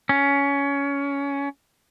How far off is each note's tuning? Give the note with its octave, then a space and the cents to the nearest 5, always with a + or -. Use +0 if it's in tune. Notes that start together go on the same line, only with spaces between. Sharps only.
C#4 +20